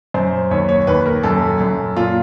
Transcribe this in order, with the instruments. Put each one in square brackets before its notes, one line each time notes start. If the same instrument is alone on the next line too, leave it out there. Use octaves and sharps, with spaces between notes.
[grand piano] F#2 C5
D#2 C#5
C#5
D#2 B4
A#4
F#2 A4
F#2
A#2 F4